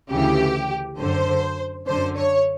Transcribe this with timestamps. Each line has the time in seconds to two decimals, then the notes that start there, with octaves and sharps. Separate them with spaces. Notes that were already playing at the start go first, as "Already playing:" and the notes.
0.10 D2 C#3 E3 G4
0.98 F#2 D3 C5
1.87 F#2 D3 C5
2.17 C#5